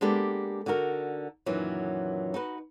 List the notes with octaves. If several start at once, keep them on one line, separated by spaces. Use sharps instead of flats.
G#3 A#3 B3 D4 G4 A4
D3 D#4 F#4 A#4
F#2 A#2 D#3 E3 F#3
D#4 F#4 B4